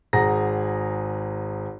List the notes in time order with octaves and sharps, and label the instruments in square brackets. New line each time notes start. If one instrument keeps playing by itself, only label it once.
[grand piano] G#1 G#4 F#5 A#5 A#6